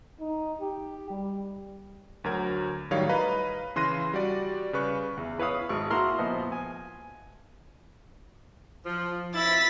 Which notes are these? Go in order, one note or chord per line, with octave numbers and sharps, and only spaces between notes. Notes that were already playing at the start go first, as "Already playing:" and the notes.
D#4
G4
G3
D2 F#3 A#4 G#6
A2 D#3 F#3 G3 C#5 F5
B4 D#5 F5 A#5 B5
C#3 E3 C6 F#6 A#6 D#7
G3 F#4 D5
C#3 B4 C#6 F#6
E2
E4 B4 C#5 F5 D#6
G#1 C#6
A#3 E4 F#4 A#5 C6 F6
A#2 F3 B3 D#5
G#5
F3
E4 A6 B6